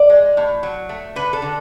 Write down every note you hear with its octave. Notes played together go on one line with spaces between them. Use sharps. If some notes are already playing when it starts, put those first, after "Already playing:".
Already playing: D5
G#3
A2
F#3
A3
D3 B4
A4
D3